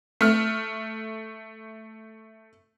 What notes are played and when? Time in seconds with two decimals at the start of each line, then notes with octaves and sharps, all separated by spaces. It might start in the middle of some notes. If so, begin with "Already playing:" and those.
0.21 A3 F6